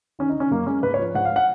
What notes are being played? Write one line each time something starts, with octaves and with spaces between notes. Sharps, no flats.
D#3 C#4
D#4
D#3 C#4
F#2 A#3
G#3 C#4
G#2 B4
C#5
F3
G#2 F#5
F5
F#5